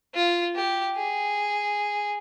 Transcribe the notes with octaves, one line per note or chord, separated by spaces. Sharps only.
F4
G4
G#4